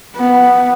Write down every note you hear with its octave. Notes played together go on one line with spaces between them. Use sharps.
B3